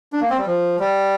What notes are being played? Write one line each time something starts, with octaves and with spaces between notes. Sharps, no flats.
D4
A#3
C4
G3
F3
G3